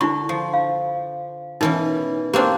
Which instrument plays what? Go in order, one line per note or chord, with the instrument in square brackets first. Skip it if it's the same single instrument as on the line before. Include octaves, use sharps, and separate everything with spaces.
[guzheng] D3 [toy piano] D4 E4 C#6
[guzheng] F3
[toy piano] F5
[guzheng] B2 E3 C#4 [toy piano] D#4 A#4
[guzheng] A#3 C4 D4 [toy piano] G4 B4 C5